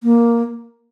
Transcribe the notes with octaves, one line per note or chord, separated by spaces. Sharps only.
A#3